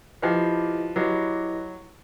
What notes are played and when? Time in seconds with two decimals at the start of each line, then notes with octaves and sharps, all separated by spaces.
0.22 F3 E4 G4 B4 D#5
0.96 F#3 E4 G4 B4 D#5